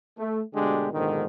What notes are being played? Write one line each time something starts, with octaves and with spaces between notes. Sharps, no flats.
A3
D2 B2 D3 G#3 D4 G4
A#1 G#2 B2 D3 D#3